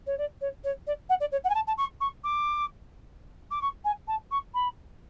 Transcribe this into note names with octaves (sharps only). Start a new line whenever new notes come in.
C#5
D5
C#5
C#5
D5
F#5
D5
C#5
F#5
G#5
A5
A5
C#6
C#6
D6
D6
C#6
G#5
A5
C#6
B5